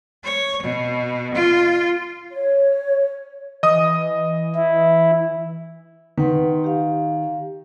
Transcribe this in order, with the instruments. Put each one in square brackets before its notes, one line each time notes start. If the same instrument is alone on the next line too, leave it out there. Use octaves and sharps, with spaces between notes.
[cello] C#5
B2
F4
[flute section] C#5
[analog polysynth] E3 [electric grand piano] D#5 D#6
[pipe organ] E4
[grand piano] D#3 [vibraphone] B4 F#5 C6
[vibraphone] G4 F5